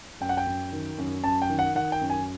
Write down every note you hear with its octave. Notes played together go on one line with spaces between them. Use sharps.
F#2 G5
F#5
G5
F#2
D#3
F#2
F#2 A5
G5
D#3
F#5
D#3 F#5
G5
F#2
G#5